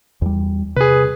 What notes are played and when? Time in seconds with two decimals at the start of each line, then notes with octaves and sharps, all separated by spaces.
0.22 E2 G3
0.76 C3 G#4 B4